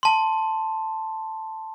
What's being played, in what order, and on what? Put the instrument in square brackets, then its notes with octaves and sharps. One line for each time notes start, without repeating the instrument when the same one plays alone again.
[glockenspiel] A5 C6